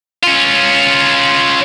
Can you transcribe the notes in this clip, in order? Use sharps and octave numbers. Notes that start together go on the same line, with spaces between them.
C#4 F4